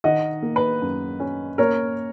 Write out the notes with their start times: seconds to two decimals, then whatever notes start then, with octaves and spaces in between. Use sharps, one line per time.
0.04 D#3 D#5 F#5
0.42 A#3
0.56 B4
0.82 F#2
1.20 C#4
1.58 A#3 A#4 C#5